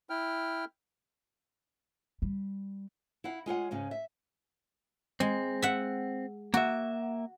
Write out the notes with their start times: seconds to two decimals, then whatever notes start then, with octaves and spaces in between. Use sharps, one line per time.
0.10 E4 G5 F6
2.22 G3
3.24 E4 F5 F#5
3.46 G#3 F4 C#5 F#5
3.71 G#2 C#3 C#4
3.91 E5
5.20 G#3 C4
5.62 E5 F#5
6.54 A#3 F#4 E5